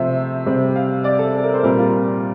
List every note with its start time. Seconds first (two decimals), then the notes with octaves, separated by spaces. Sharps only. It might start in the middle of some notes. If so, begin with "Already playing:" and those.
Already playing: C3 F3 A3 C5 E5
0.46 C3 G3 C4
0.76 F5
1.04 D5
1.19 A4
1.38 A4
1.44 A#4
1.54 C5
1.63 A#2 G3 C4 A#4
1.78 F4